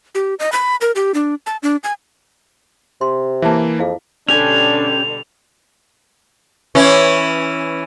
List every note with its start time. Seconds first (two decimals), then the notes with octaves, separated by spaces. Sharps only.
0.15 G4
0.39 D#5
0.52 B5
0.81 A#4
0.96 G4
1.14 D4
1.46 A5
1.63 D4
1.84 G#5
3.01 C3 C6
3.42 E3 A#3 E5 A5
3.79 F2 E4 G#4 F5
4.28 B2 D3 G3 C#4 D4 G4 G#5 F7
6.75 E3 C#4